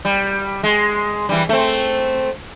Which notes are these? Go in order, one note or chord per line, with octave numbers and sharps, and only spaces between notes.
G3
G#3
E3 G3
A3 C4